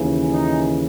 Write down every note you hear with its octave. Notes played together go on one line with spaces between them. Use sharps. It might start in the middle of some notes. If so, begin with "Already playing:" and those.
Already playing: D#2 C#3 E3
D#4